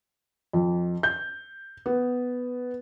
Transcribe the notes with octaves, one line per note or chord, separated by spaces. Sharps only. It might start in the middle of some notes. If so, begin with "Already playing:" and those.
F2
G6
B3